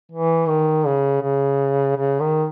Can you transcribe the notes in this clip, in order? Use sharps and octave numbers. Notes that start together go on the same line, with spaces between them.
E3
D#3
C#3
C#3
C#3
D#3